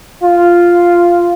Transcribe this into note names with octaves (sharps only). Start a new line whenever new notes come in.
F4